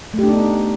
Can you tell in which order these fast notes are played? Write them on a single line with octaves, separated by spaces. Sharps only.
A3 G4 D4 D#4 B3